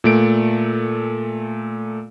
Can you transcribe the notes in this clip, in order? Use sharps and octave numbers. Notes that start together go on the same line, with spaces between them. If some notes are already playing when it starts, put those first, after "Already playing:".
A#2 A3 D7